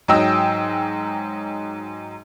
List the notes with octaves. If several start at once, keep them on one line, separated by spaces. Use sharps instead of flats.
G#2 F#3 D#5 G5 E6